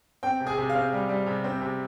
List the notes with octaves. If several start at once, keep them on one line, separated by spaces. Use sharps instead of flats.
C4 G5
C3
G#4 G#5
C3
F5
C4
G3
G3
C3
C4
C3